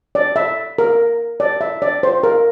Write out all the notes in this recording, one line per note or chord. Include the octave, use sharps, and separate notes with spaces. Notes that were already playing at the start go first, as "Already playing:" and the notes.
D5
E5
A#4
D5
E5
D5
C5
A#4